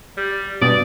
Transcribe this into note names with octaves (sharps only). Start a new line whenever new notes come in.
G3
G2 B2 D5 D#6